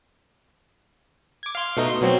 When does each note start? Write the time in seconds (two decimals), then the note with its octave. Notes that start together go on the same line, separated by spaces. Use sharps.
1.43 D6 G#6
1.55 F5 C6
1.77 B2 A3 D#4
1.89 C6
2.01 B2 F#3 C4